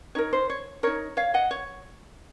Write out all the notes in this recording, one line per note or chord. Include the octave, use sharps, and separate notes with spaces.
D#4 A#4 C#5
C5
C#5
D#4 A#4 C#5
C#5 F5
D#5 F#5
C#5